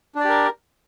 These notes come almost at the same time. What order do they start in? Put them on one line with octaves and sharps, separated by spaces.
D4 D5 G4 A#4